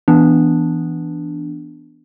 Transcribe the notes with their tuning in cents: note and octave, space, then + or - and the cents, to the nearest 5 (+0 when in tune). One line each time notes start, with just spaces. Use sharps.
E3 +0 B3 +0 D4 +0